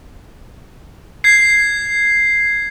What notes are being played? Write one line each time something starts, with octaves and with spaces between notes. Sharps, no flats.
G#6 C7